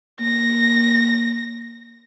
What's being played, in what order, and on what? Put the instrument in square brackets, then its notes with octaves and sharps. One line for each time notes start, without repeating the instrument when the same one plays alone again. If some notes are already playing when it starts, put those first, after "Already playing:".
[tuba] A#3 [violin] A#6